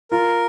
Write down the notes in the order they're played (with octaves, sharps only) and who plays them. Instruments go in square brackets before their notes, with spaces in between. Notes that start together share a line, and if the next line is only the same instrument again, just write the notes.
[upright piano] F4 [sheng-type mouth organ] A#4